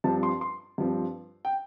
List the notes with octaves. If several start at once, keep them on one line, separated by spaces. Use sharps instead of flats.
G2 F3 C4 A5
C6
C6
G2 F3 C4
G5